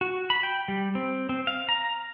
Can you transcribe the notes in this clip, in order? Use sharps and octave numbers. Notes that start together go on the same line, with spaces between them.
F#4
B5
G5
G3
C4
C4
F5
A#5